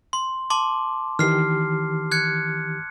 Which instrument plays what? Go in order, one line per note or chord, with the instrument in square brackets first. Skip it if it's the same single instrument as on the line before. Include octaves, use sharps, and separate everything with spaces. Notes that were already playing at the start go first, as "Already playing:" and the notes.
[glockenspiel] C6
A5 C6 D6
[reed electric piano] D#3 E3 G4 [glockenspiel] F6 C7
[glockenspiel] F#6 G#6 C#7